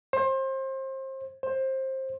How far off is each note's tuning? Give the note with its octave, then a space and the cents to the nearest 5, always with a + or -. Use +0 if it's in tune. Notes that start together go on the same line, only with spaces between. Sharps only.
C5 +30
C5 +20